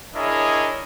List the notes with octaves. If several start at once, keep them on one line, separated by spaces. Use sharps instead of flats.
D4 E4 G#4 A#4 C#5 D#5